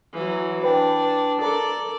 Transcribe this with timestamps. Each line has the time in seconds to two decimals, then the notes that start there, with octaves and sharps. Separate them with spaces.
0.14 E3 F#3
0.64 D4 B4 G5
1.42 A4 A#4 D5 A#5